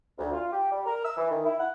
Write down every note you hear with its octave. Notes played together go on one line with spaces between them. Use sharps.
D2
F4
G4
G3
A#4
E6
E3
D#3
E4
F#5